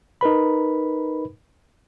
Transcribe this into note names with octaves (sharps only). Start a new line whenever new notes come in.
D#4 A#4 B4 B5